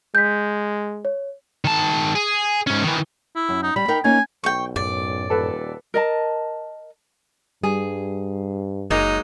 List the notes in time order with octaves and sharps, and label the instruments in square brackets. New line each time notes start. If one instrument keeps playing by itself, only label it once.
[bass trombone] G#3 [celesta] G6 B6
[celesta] C#5
[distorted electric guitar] D#3 A5
G#4
G#2 C#4
D#3 E3
[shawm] E4
[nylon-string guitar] F#2
[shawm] D#4
[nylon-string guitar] G3 [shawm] B5
[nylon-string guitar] D#4 A#4 G5
[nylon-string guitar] A#3 C#4 D#4 [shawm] G#5
[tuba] B1 [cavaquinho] G5 C#6
[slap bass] F#2 A2 [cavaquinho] D5
[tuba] D#1 [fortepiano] A4 B4
[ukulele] A#4 D#5 A5
[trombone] G2 [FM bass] G3 [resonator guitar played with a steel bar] G#4
[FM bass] F#1 [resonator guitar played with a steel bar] F#3 G#3 A#3 [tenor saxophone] D#4